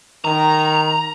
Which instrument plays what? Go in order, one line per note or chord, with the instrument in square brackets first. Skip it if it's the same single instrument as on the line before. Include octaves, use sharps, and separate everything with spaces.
[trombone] D#3 [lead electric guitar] A#5